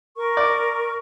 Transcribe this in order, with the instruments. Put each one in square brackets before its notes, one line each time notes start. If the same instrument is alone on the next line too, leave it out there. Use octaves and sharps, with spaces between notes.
[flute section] A#4 C#6
[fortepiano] D5